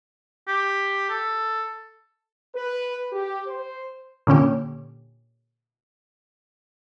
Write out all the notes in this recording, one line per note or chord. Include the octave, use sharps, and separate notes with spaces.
G4
A4
B4
G4
C5
A#2 D3 C#4 G4